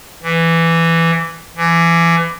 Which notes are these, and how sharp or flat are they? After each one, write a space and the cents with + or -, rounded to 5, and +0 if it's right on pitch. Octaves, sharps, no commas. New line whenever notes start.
E3 +10
E3 +30